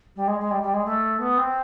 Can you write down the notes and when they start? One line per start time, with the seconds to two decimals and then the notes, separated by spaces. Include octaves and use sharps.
0.16 G3
0.27 G#3
0.40 G#3
0.51 G3
0.62 G3
0.73 G#3
0.85 A3
1.20 B3
1.37 C4